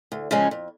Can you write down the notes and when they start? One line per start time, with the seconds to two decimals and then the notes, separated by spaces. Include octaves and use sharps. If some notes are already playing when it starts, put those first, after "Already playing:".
0.12 D2
0.31 C#3 F3 G#3 C#4
0.51 F2